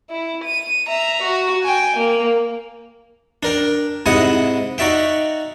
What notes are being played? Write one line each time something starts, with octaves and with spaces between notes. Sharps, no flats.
E4
D#7
E5 A#5
F#4
G5 G#5
A#3
D4 A#4 G5
G#2 C3 E4 D#5 F#5 D#6
D#4 F#4 D5 E5 G5